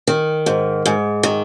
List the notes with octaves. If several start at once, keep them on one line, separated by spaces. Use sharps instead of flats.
D#3
G#2
G#2
D#3